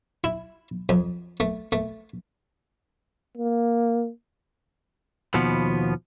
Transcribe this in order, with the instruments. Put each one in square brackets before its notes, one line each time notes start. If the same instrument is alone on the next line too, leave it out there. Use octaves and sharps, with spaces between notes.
[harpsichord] E4
F2
A3
A3
[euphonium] A#3
[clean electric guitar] D#2 B2 F3 B3